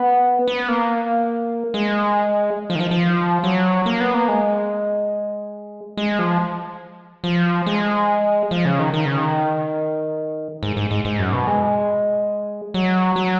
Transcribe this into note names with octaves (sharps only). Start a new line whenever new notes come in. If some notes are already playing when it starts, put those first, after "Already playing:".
Already playing: B3
B3
A#3
G#3
F3
D#3
F3
F3
F#3
A#3
B3
A#3
G#3
G#3
F3
F3
G#3
F3
C#3
D#3
D#3
C#3
D#3
G#2
G#2
G#2
G#2
F#2
B2
G#3
F#3
F#3